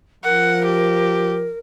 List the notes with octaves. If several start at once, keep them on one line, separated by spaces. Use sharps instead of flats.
F3 A#4 F#5
G4